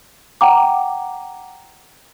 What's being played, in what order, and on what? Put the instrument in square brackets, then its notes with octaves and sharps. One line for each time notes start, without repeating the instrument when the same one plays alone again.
[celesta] F#5 G5 A#5 D6